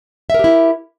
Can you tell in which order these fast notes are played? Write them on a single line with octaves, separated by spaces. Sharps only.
E5 A#4 G4 E4